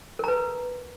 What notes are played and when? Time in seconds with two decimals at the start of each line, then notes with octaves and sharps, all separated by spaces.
0.19 A#4
0.24 A#5
0.28 B4